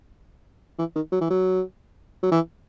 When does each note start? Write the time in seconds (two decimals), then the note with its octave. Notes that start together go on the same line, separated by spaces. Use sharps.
0.79 E3
0.96 D#3
1.12 F#3
1.21 E3
1.30 F#3
2.23 F#3
2.32 E3